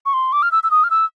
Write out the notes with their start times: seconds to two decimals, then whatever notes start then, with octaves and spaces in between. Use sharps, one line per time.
0.06 C#6
0.13 C6
0.32 D6
0.42 F6
0.52 E6
0.63 E6
0.71 D#6
0.84 F6
0.90 E6